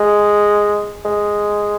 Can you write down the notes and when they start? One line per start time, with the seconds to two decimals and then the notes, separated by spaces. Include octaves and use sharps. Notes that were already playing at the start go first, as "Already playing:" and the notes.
Already playing: G#3
1.05 G#3